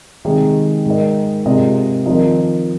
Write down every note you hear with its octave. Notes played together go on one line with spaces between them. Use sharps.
C3 D#3 G#3 D#4 G#4 D#5
G#2 G#3 D#4 A#4 D#5
G#2 C3 G#3 F4 A#4 D#5
D#3 F3 C4 D#4 A#4 D#5